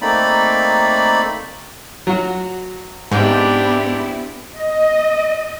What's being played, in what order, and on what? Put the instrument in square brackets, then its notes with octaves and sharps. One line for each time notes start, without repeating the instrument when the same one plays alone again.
[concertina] A3 A#3 C4 D#4 D5 B5
[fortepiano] F#3 F#4
[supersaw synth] G#2 [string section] B3 C4 E4 [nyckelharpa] D4 G4
[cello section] D#5